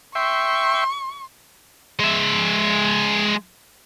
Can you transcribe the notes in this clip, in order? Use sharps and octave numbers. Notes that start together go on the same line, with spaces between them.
E5 G5 C6 C#6
G#3 E5